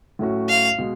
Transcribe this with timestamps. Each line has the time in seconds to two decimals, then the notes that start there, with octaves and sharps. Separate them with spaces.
0.19 A2 F#3 A3 C#4 F#4
0.49 F5
0.79 B2 G#3